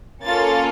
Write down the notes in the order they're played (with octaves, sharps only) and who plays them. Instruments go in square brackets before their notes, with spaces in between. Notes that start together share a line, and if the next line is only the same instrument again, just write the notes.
[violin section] A#3 C#4 F4 A4 A6